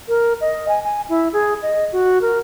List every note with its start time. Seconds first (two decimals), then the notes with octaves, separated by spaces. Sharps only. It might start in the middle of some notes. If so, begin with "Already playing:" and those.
0.09 A#4
0.41 D#5
0.68 G#5
0.84 G#5
1.09 E4
1.33 G#4
1.62 D#5
1.93 F#4
2.21 A#4